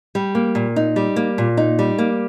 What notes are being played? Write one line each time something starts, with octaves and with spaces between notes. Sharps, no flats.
G3
A#3
A#2
D#4
G3
A#3
A#2
D#4
G3
A#3